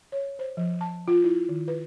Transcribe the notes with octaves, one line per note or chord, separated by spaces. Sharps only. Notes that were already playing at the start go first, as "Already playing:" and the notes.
C#5
C5
F3
A5
F4
E4
D#3
B4